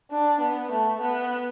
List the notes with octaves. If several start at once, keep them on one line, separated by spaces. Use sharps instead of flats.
D4
B3
A3
B3